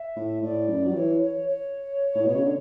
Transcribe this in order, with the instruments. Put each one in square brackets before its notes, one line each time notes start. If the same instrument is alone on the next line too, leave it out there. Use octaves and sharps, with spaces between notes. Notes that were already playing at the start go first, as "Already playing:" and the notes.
Already playing: [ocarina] E5
[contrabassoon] A2
[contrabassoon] A2 [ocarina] D5
[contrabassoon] F#2
F#3
[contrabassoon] E3 [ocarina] C#5
[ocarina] C#5
C#5
[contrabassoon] A2
B2
C#3
D3